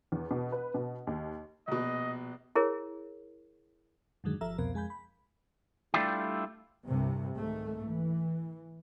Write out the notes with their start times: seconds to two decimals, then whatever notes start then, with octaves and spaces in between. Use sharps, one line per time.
0.12 E2
0.31 B2
0.52 B4
0.74 B2
1.07 D#2
1.68 A#1 B2 D#5
2.55 E4 G#4 A#4 C#5
4.24 F#2 A2 D3 D#3 F#3 G#3
4.41 G1 F3 A4 E5 A#5 E6
4.58 C2 F2 B2 A#4
4.74 F2 G#3 G#5 B5 G6
4.90 B5
5.94 G3 A3 D4 E4 F4 G4
6.88 C2 G2 C3
7.37 G#2 D#3 A3
7.85 E3